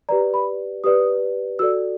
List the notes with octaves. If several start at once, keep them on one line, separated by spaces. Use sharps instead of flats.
G4 B4 D5 A#5
B5
G4 B4 D5 D#6
F#4 A4 D5 E6